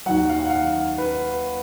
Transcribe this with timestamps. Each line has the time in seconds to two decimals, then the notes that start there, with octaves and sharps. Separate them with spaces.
0.06 D#2 D#3 F#3 F#5
0.29 F5
0.39 F#5
0.50 F5
0.98 B4